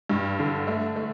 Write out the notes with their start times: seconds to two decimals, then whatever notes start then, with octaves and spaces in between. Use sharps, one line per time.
0.10 G2
0.39 D3
0.67 A3
0.96 A3